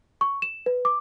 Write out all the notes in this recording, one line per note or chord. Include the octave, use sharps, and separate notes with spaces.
C#6
E7
B4
D6